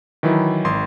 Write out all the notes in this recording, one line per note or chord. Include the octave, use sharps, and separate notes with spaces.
D#3 E3 F#3 E4
G#1 C6